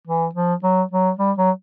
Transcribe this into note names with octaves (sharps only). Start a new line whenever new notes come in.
E3
F3
F#3
F#3
G3
F#3